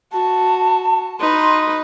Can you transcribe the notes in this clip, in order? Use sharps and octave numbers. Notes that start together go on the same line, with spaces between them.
F#4 A5
D#4 B4 C6